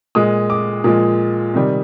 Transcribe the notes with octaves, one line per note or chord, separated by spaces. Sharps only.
A#2 G#3 D#6
D6
A#2 F3 G#3
C3 D#3 G3